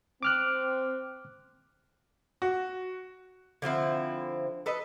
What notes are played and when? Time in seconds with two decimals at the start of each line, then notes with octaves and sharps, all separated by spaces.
0.23 C4 D6 F6 F#6
2.42 F#4
3.62 D3 F3 C4 E4
4.66 A4 B4 D#5